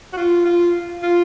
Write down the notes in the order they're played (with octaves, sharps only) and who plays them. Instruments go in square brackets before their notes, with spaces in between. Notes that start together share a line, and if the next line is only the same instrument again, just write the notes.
[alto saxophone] F#4
F4
F4
F4